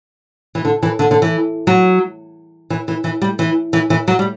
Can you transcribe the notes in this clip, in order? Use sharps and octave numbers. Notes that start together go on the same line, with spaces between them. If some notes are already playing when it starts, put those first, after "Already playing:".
E3
D3
E3
D3
D3
E3
F#3
E3
E3
E3
G3
E3
E3
E3
F#3
G3